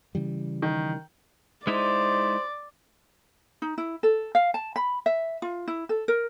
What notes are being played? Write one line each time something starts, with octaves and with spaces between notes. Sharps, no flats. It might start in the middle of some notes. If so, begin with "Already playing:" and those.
C#3 E3 G3
D#3
G#3 D#4 E4 C5 D5
D#4
E4
A4
F5
A5
B5
E5
F4
E4
A4
A#4